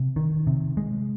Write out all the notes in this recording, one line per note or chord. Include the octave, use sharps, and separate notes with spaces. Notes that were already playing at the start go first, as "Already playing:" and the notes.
Already playing: C3
D#3
C3
G#3